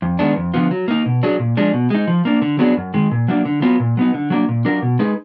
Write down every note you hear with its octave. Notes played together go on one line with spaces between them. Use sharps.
F2
D#3 G#3 B3 D4
F2
D3 F3 B3 F4
F#3
A#3 D#4
B2
F#3 D4 G#4
A#2
F3 G#3 D4
B2
G#3 D#4
F3
A#3 D4
D3
F#3 B3 D4 G#4
F#2
D#3 G#3
A#2
F#3 A#3 D4
D3
F#3 B3 F4
A#2
F#3 B3 D#4
D3
F#3 A#3 D4
A#2
F#3 D4 F4 A#4
B2
G#3 D#4 G#4 B4